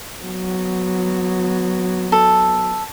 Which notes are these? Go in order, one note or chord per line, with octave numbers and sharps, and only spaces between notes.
F#3 B3
A4